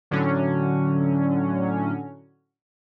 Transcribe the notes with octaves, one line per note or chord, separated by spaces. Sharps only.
A2 D3 F#3 C#4